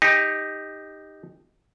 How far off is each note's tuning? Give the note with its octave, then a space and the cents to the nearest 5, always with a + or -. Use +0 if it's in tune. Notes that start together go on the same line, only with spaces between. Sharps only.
D#4 +0 G4 +20